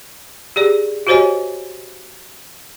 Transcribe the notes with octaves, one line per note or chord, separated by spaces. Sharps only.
G4 G#4 D5
F#4 G4 C5 C#5 D#5 G#5